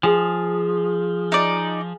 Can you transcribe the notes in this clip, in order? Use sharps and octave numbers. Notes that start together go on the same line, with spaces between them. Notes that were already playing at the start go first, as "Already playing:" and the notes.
F3 G#4
D#4 D5